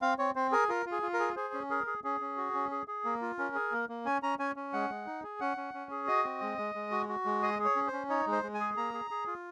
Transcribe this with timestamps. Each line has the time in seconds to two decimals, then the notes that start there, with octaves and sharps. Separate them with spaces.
0.02 C4 F5
0.18 C4 C#5
0.36 C4 C5
0.52 G#4 A#4
0.69 F4 A#4
0.86 F4
0.92 G#4
1.02 F4
1.14 A#4
1.20 G#4
1.36 G#4 C5
1.54 C#4
1.70 G#4 A#4
1.87 G#4
2.04 C#4 G#4
2.21 C#4
2.37 F#4
2.54 C#4
2.71 G#4
2.88 G#4
3.05 A#3
3.22 F4
3.39 C#4 A#4
3.55 G#4
3.72 A#3
3.89 A#3
4.06 C#4 G#5
4.22 C#4 A#5
4.39 C#4 G#5
4.56 C#4
4.73 G#3 F#5
4.90 G#3
5.06 D#4
5.23 G#4
5.40 C#4 F#5
5.57 C#4
5.74 C#4
5.91 G#4
6.08 F#4 D#5
6.24 C4
6.41 G#3
6.58 G#3
6.75 G#3
6.91 F#4
7.09 F#4
7.25 G#3
7.42 G#4 D#5
7.59 G#4
7.65 C#5
7.76 C#4
7.87 C5
7.93 C#4
8.10 D#4 C#5
8.27 G#3
8.32 C5
8.43 G#3
8.54 G#5
8.60 G#4
8.77 A#3 A#5
8.94 G#4
9.11 G#4
9.27 F4